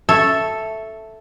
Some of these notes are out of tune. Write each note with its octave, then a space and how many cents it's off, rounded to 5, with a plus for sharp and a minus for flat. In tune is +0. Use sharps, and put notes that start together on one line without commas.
A4 +0 C#5 +0 E5 +0